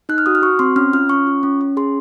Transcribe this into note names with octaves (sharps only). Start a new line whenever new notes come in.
D#4 F#6
F6
F#4 D#6
F6
F#4 C#6
C4 C6
C#4 F6
F4 F6
C#4 C#6
F4
C#4
C#4
G#4 C6